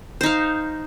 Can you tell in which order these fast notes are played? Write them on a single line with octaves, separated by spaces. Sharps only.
C5 D#4 F5